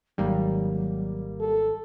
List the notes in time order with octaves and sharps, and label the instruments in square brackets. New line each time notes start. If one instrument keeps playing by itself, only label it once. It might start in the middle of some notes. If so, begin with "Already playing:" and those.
[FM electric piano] G#1 G#2 D#3 [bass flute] F#3 [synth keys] G3 A#3
[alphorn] A4